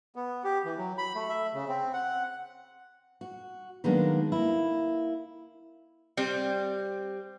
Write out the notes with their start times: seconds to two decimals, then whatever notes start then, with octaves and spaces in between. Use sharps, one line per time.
0.16 B3
0.44 G4
0.65 E3
0.77 F#3
0.98 B5
1.15 A3
1.29 E5
1.54 C#3
1.68 C4
1.93 F#5
3.21 F#4
3.84 D#3 F#3 G#3 A#3 B3 D4
4.32 A#3 E4
6.17 G3 C4